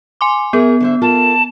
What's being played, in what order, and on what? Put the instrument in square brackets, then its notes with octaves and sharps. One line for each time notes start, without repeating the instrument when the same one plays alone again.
[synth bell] G#5 C6 D6
[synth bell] B3 [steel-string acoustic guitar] G#4 A#4 E5
[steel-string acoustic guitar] D3 C5 E5
[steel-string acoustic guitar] F4 A4 A#4 [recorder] A5